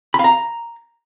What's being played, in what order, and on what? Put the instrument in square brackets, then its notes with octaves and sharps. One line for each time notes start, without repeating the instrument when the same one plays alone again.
[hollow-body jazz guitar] B5
F5
A#5